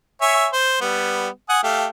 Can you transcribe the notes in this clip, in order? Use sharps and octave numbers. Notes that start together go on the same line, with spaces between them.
C#5 E5 G#5
C5
G3 B3
F#5 G#5 D#6
A3 G4 F5